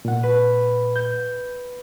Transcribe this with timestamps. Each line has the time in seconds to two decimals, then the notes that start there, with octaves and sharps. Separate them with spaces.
0.05 A#2 F#5
0.23 B4
0.95 G6